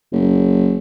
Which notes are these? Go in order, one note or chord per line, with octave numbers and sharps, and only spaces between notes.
F#1